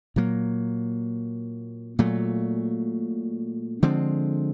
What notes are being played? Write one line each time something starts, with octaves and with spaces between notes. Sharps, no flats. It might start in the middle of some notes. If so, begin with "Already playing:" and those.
A#2 F#3 A#3
A#2 F#3 A3
D3 F3 G#3 C4